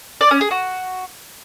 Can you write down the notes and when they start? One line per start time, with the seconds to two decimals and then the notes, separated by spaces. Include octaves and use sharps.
0.21 D5
0.31 C#4
0.41 G#4
0.51 F#4